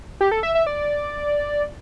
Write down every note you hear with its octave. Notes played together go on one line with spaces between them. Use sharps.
G4
A4
E5
E5
D5